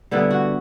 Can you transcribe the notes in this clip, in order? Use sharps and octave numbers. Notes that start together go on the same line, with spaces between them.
D3 G3 B3 E4
F#4